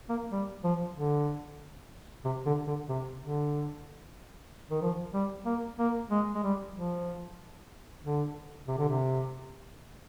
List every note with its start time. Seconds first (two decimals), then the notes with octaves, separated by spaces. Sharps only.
0.09 A#3
0.32 G3
0.64 F3
0.95 D3
2.25 C3
2.46 D3
2.67 D3
2.89 C3
3.20 D3
4.70 D#3
4.82 F3
5.14 G3
5.45 A#3
5.79 A#3
6.11 G#3
6.35 G#3
6.43 G3
6.75 F3
8.04 D3
8.68 C3
8.78 D3
8.88 C3